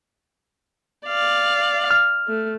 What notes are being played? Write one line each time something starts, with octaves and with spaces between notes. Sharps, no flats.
D5 F5
F6
A3